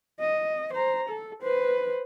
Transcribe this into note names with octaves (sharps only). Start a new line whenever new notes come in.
D#5
C5 A#5
A4
B4 C5